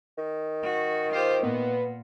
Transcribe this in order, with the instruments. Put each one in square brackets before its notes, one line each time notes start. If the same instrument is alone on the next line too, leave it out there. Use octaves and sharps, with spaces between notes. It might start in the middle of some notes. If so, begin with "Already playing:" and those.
[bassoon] D#3
[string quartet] F#4
[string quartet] F4 G4 [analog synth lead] C5
[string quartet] A#2 [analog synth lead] B3